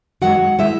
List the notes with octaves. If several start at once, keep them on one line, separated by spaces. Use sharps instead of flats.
F#2 D#3 G#3 F#4 F#5
D#3 G#3 E4 E5